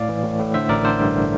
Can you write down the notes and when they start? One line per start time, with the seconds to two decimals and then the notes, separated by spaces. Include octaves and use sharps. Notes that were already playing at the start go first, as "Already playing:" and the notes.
Already playing: A2 D5 F5
0.09 E3
0.24 A2
0.39 A2
0.54 D3 C5 E5
0.69 A1 A#4 D5
0.84 D3 A4 C5
1.00 G2